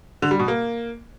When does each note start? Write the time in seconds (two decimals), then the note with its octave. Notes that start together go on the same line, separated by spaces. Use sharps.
0.22 D3
0.31 G3
0.39 B2
0.48 A#3